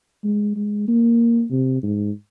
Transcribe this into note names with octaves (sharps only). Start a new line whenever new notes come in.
G#3
G#3
A#3
C3
G#2